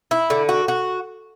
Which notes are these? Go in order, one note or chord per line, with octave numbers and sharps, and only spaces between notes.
E4
D3
F#4
F#4